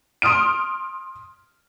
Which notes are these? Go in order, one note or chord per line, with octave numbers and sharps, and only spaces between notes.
C6 D#6 F6 D7